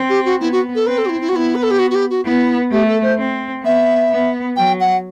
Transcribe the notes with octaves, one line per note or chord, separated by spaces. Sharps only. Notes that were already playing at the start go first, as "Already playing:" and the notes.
Already playing: C4
G4
F#4
B3 E4
F#4
A4
C4 B4
A4
F#4
E4
E4
F#4
B3 E4
B4
A4
G4
F#4
F#4
G4
F#4
B3 E4
A3 G4
A4
C5
C4
B3 E5
B3
F#3 G5
F#5